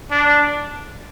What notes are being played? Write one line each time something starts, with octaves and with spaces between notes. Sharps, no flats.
D4